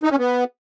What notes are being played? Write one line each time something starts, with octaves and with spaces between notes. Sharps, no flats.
D#4
C#4
B3